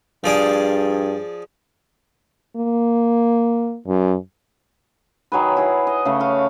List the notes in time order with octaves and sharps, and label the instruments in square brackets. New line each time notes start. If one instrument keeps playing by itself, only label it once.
[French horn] G2 [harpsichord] F3 G#4 D5
[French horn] A#3
F#2
[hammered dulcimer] D#3 F#3 G#4 B4
E4 G#4
D#5
C#3 A3
C#5 F5